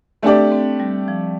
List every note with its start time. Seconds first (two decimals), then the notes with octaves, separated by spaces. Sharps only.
0.23 A3 C4 D4 G4 D5
0.52 C4
0.80 G3
1.08 F3